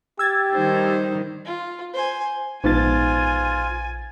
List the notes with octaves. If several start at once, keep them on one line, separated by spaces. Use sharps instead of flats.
G4 E6 G#6 A6
D#3 G3 D#4 C5
F4
C5 G#5
A#1 G#2 B2 F3 F4 G#5 A6